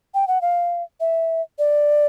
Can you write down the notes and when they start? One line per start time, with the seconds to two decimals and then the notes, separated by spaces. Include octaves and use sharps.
0.14 G5
0.28 F#5
0.42 F5
1.00 E5
1.59 D5